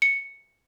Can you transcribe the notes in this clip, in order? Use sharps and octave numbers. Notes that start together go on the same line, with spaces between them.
C#7